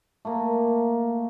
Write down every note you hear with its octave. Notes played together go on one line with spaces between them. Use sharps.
A3 A#3